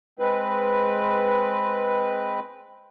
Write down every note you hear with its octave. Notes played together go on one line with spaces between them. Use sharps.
G#3 C4 B4